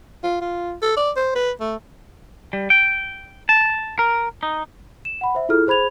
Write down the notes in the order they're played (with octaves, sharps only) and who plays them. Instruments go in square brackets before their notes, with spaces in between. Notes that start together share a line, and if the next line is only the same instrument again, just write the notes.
[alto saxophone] F4
F4
A4
D5
C5
B4
A3
[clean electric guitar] G3
G5
A5
A#4
D#4
[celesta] E7
F#5 B5
C5 E5
E4 F4 G#4 A4 F6
G#4 C5 B5 G#6 F7